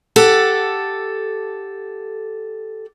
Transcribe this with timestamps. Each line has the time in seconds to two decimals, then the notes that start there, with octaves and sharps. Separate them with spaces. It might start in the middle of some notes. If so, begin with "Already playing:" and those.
0.16 G4 A4 F#5